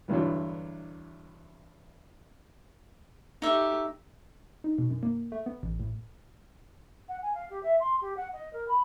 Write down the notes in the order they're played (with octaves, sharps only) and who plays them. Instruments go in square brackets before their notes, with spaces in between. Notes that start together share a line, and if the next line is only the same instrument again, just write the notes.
[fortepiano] E2 G2 D3 E3 F#3
[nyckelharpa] A3 G4 [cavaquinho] D#4 E5
[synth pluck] D#4
B2
F#2
A#3
A3
B3
A1
A2
[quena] F#5
G#5
F5
G4
E5
C6
G4
F#5
D#5
A#4
B5